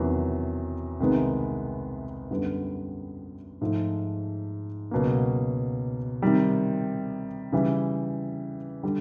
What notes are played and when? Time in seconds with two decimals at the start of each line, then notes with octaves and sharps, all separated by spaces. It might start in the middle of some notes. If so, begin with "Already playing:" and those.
Already playing: E2 C3 D#3 F#3
1.00 C2 C3 D#3 G#3 B3
2.31 F#2 D3 G3 B3
3.61 G#2 F3 A3
4.91 C#2 B2 F#3 A#3
6.22 C3 D#3 G3
7.52 C#3 E3 G3
8.83 D3 G3